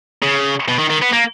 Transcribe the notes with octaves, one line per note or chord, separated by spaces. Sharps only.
C#3
B2
D#3
D#3
B3
A#3